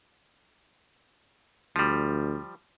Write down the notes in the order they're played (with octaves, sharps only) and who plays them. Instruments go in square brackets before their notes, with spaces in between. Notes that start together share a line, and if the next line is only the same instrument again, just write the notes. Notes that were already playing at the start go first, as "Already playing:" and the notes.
[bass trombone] D2 [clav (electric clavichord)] F3 G3